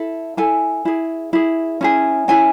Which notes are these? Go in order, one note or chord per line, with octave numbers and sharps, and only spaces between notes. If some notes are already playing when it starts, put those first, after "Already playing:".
Already playing: E4 A4
E4 A4 G#5
E4 G#4
E4 G#4
C#4 E4 G#4
C#4 E4 G#4 G#5